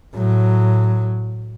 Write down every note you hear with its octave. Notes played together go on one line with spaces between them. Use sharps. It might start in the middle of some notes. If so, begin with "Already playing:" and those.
A2 F#3